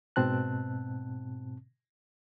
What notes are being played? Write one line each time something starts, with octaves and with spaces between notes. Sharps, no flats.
G#2 B2 C4 A5 F#6